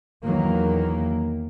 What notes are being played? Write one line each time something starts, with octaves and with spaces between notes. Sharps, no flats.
E2 D#3 F#3 A#3